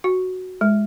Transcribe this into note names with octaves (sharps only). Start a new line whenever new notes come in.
F#4
G#3